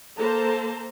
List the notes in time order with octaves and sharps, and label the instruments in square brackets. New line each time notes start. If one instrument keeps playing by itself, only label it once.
[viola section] A#3 A4 C5 A5 A#5